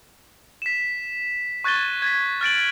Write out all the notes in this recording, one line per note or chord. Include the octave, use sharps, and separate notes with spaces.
B6 E7
C#6 F#6 G#6 A6 D#7 G7
G#6 A6 B6
F6 A6 D7 F#7